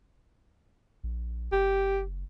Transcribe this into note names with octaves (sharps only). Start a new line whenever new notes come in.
A#1
F#1 G4